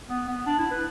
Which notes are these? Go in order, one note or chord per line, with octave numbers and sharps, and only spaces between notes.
B3
B3
D4
E4
B4